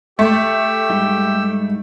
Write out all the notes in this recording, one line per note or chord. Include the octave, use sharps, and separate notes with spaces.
A3 G4 G5 E6
G#2 G3 D#4